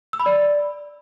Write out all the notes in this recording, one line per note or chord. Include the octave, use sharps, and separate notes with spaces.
E6
B5
D5